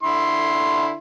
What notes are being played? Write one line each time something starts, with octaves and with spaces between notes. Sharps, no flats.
D3 E4 C6